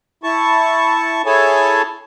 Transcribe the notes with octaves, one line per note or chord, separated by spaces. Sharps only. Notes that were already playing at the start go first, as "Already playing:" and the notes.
E4 A5 C#6
E4 G#4 A4 C#5 G#5 A5